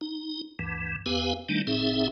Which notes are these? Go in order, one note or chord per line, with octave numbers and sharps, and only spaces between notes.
D#4
D2 G2 E3
E2 B3 G4 B4 F5 G#5
D#3 G3 A3 D4 D#4
F#1 A2 C4 D#4 G#4 E5